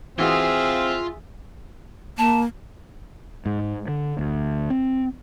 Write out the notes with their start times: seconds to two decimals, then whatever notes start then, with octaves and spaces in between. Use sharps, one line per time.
0.19 E3 C4 F4 F#4 G#4 E5 D#6
2.18 A#3 A5
3.46 G#2
3.88 D3
4.19 D2
4.70 C4